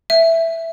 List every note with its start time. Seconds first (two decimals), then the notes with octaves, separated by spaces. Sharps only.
0.10 E5